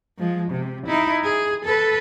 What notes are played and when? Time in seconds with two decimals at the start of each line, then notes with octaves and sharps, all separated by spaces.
0.19 F3 G#3
0.51 C3
0.87 D#4 E4
1.24 G#4
1.65 A4 B4